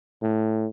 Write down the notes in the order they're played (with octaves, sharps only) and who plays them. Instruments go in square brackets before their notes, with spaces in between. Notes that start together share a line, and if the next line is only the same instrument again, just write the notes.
[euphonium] A2